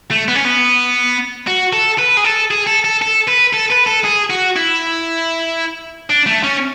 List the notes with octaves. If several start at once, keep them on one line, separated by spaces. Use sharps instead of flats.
A3
B3
C#4
B3
F#4
A4
B4
G#4
A4
G#4
A4
A4
A4
B4
A4
B4
A4
G#4
F#4
E4
D4
A3
C#4